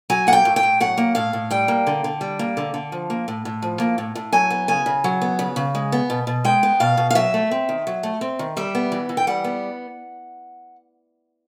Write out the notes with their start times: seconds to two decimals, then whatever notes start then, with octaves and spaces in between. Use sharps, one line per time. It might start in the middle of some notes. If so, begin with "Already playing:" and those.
0.10 F#3 G#5
0.27 A#3 F#5
0.33 G5
0.45 A2
0.56 G5
0.63 A2
0.80 F#3 F#5
0.98 A#3
1.15 A2 F5
1.33 A2
1.51 G3 G5
1.68 A#3
1.87 D3
2.04 D3
2.21 G3
2.39 A#3
2.57 D3
2.74 D3
2.92 F3
3.10 A#3
3.28 A2
3.45 A2
3.62 F3
3.80 A#3
3.98 A2
4.15 A2
4.33 F#3 G#5
4.50 B3
4.68 C#3 G#5
4.86 C#3
5.04 F#3
5.22 B3
5.39 C#3
5.56 C#3
5.75 G#3
5.92 B3
6.10 B2
6.27 B2
6.45 G#3 G5
6.63 B3
6.80 B2 F5
6.97 B2
7.10 F5
7.15 F#3 E5
7.34 A3
7.51 C4
7.69 D#3
7.87 F#3
8.03 A3
8.21 C4
8.39 D#3
8.57 G3 E5
8.75 B3
8.92 E3
9.09 E3
9.17 G5
9.27 G3 F#5
9.44 B3